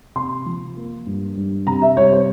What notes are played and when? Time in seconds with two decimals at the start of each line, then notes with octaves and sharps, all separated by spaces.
0.16 C3 C6
0.46 F3
0.77 A#3
1.06 G2
1.37 G2
1.67 C3 A#5
1.82 E5
1.97 G3 C#5
2.13 C5